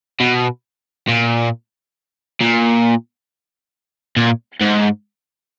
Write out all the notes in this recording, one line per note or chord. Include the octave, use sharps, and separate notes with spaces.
B2
A#2
A#2
A#2
G#2